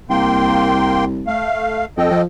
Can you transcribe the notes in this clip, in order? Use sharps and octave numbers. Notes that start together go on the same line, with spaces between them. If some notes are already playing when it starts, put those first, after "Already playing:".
C2 A#3 G5 C6
A3 F5
F2 A4 D#5 G5
F3